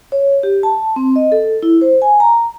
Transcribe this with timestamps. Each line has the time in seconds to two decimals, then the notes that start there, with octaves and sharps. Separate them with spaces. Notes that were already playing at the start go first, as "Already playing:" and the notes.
0.12 C#5
0.43 G4
0.63 A5
0.96 C4
1.16 D#5
1.32 A4
1.63 E4
1.81 C5
2.02 G#5
2.20 A#5